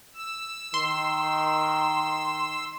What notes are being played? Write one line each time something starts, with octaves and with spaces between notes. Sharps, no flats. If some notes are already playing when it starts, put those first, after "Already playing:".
E6
D#3 C6